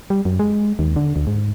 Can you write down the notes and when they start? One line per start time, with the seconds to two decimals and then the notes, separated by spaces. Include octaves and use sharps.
0.10 G3
0.25 F#2
0.39 G#3
0.79 D#2
0.96 D3
1.16 D2
1.27 G#2